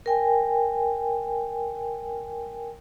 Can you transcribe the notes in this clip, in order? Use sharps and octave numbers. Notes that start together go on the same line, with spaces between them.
A#4 G5 G#5